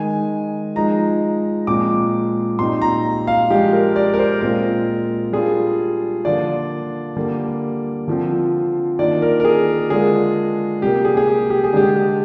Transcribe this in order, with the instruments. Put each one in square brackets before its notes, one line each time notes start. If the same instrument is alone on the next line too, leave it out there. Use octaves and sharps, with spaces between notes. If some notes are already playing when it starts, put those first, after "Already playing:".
Already playing: [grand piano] D#3 G#3 D#4 G#5
F3 G#3 D#4 A#5
A#2 F3 G#3 C4 D6
A#2 G3 C4 D#4 C6
A#5
F5
F3 G#3 D4 F4 G4
A#4
D5
A#4
C5
A#2 G#3 C4 F4 A#4
G3 D4 F4 G#4
D3 F3 A#3 D4 F4 D5
D3 G3 A#3
D3 F3 C4
D#3 A#3 D4 F4 D5
A#4
A#4
G#4
D3 G#3 D4 F4 G#4
C3 G3 A#3 G4
G#4
G#4
G4
G4
G#4
D3 G#3 D4 G4